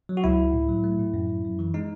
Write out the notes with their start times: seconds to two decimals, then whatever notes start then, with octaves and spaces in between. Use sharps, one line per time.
0.09 F#3
0.17 F#4
0.24 C#2 E4
0.38 C#2
0.54 A2
0.69 F#3
0.84 A3
0.99 A2
1.14 F#2
1.29 F#2
1.45 F#2
1.59 E3
1.74 G#3 D#4